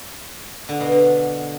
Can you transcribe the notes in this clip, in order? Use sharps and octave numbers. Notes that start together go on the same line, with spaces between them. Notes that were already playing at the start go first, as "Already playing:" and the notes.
D3
B2
D3